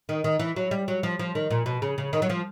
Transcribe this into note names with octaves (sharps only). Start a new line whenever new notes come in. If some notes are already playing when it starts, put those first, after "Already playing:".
D#3
D#3
E3
F#3
G3
F#3
F3
F3
D#3
A#2
B2
C#3
C#3
D#3
F#3
F3